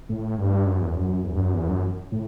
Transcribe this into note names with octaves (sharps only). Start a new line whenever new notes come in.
A2
G2
F#2
E2
F#2
E2
G2
F#2
E2
F#2
A2